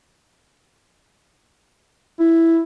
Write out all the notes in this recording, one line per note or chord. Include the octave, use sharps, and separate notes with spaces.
E4